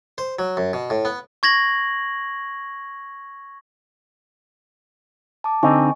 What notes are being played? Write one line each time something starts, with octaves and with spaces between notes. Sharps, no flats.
C5
F#3
F#2
B2
A2
B3
C#6 G#6 A#6 F#7
A5 D6
D3 C4 D#4 D#5 G#5 C#6